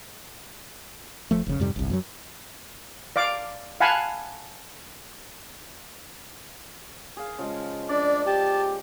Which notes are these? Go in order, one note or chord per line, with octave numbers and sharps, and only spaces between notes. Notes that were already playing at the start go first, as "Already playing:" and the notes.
E1 F3 A3
F1 C#3
F2 G#2 C3 G3
G1 C2
F#2 A#2 F#3
D5 F5 D6
F5 F#5 G#5 A5 B5
G#4 F5
C#3 F3 G#3
D4 D5
G4 A5